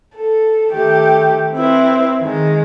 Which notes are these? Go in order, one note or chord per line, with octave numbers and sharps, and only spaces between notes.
A4
D#3 A3 G4
C4 E4 B4
D#3 G#3